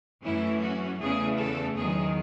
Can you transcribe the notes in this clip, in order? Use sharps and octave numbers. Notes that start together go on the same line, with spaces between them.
F#2 E3 A3 C#4 E4
F#4
E2 C#3 E3 A3 G#4
A4
E2 D#3 F#3 G#4